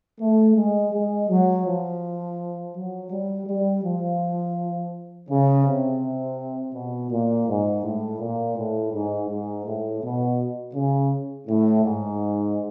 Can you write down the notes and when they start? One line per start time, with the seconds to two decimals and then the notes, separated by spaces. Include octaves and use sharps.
0.21 A3
0.56 G#3
0.93 G#3
1.29 F#3
1.66 F3
2.75 F#3
3.12 G3
3.47 G3
3.84 F3
5.30 C#3
5.66 C3
6.75 B2
7.11 A#2
7.47 G#2
7.84 A2
8.20 A#2
8.57 A2
8.93 G#2
9.29 G#2
9.65 A2
10.02 B2
10.74 C#3
11.48 A2
11.84 G#2